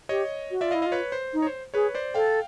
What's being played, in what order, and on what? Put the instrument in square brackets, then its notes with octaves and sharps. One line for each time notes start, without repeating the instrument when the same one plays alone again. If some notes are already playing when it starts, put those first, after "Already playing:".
[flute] G4 [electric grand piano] C#5 D#5
[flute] F#4
[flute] F4 [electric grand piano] D5 E5
[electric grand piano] D#5 F5
[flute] E4
[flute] F4 [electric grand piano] D#5 F5
[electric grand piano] B4 C#5
C5
[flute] D#4
[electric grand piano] C#5
C5
[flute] G#4 [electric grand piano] B4 C#5
[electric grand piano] C5 D5
[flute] A4 [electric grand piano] F5 G5